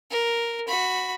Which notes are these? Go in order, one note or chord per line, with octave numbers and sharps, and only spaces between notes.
A#4
F#4 B5